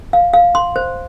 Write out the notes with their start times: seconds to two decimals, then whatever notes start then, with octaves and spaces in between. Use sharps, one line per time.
0.13 F5
0.33 F5
0.55 C6
0.76 C5